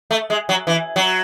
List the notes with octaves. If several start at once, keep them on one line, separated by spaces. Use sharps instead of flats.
A3
G#3
F#3
E3
F#3